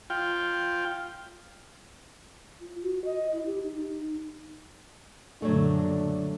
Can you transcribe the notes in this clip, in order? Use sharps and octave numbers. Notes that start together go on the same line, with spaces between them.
F4 G5
F4
F#4
D#5
E4
G4
D#4
D#4
F#2 A#2 D3 F#3 G3 A3 D4